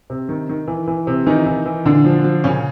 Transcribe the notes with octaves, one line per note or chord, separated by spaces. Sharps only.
C3
D#3
D#3
E3
E3
C3
D#3 E3 D#4
E3
E3
A#2 D3 D4
F3
F3
A#2 C#3 C#4